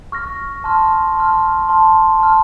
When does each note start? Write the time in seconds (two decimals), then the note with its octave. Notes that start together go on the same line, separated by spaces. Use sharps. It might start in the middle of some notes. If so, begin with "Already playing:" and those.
0.12 C#6 F6 A#6
0.64 A5 C6 F6
1.17 A5 C6 F6
1.68 A5 C6 F6
2.19 A5 C6 F6